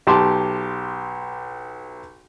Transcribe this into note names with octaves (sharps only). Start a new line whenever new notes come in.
B1 G4 A5 C6